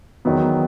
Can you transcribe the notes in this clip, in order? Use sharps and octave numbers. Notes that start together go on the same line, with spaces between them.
E2 D#3 F#3 B3